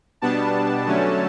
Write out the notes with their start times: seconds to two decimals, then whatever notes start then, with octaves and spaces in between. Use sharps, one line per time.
0.22 B2 G3 B3 D4 A5
0.86 D3 F#3 A3 C#4